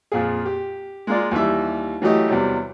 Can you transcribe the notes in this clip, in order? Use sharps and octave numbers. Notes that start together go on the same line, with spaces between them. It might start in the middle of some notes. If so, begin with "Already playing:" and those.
F2 A#2 G#4
G4
G#3 A#3 F4 D5
D#2 E3 G3 E5
E3 F#3 A3 G4 D#5
E2 C3 F#3 G3